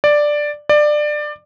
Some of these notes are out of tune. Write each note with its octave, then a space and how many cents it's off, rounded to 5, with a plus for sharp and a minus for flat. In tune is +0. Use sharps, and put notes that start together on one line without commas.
D5 +5
D5 +20